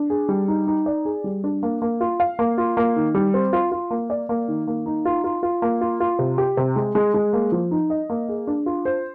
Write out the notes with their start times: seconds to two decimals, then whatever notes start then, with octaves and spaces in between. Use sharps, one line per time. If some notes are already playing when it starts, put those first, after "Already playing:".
Already playing: D4
0.10 G#4
0.29 G3
0.48 D#4
0.67 D#4
0.86 D5
1.05 G#4
1.24 G3
1.44 D4
1.63 A#3
1.82 A#3
2.01 F4
2.20 F5
2.39 A#3
2.58 F4
2.77 A#3
2.96 D#3
3.15 G3
3.34 C4
3.53 F4
3.72 F4
3.91 A#3
4.10 D5
4.29 A#3
4.48 D#3
4.67 A#3
4.86 D#4
5.05 F4
5.24 F4
5.43 F4
5.62 A#3
5.81 F4
6.00 F4
6.19 C3
6.38 G4
6.57 C3
6.76 G#3
6.95 G#3
7.14 G#3
7.33 A#3
7.52 F3
7.71 D#4
7.90 D#5
8.10 A#3
8.29 G#4
8.47 D4
8.66 F4
8.85 C5